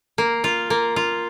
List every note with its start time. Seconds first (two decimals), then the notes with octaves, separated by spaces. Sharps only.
0.18 A#3
0.44 F4
0.70 A#3
0.96 F4